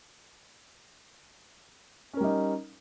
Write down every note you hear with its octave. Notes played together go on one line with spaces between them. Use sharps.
G3 C#4 D#4 A#4